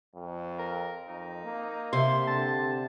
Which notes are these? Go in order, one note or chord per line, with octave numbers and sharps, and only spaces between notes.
F2
A#4
F2 D#4
A#3
C3 C6
D3 A5